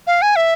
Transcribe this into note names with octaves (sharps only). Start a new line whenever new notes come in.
F5
G#5
E5